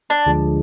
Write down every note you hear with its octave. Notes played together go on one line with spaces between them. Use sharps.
D4
D2 D3 F3 G#3